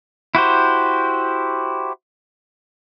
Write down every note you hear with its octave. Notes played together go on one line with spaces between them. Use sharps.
E4 F#4 G4 C5